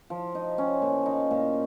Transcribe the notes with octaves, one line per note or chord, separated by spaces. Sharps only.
F3
D#4
C#4
A#2
D#4
A#2